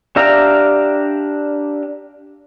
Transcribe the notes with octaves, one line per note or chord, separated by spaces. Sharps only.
D4 G4 E5 F5 A#5